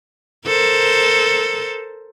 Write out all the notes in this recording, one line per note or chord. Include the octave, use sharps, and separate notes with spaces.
A4 A#4 C5